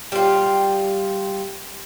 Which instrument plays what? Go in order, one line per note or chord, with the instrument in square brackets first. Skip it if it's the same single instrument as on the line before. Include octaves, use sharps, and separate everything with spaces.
[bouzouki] G3 F4